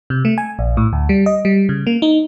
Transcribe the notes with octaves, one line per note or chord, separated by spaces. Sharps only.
C3
A3
G#5
A#1
A2
D2
G3
D#5
G3
C#3
A#3
D#4